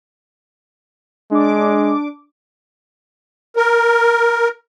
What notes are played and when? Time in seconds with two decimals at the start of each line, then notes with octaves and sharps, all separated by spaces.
1.31 G#3 D4 D6
3.56 A#4